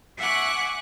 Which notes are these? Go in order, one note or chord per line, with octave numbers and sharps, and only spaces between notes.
E5 F#5 G#5 C#6 D6 F#6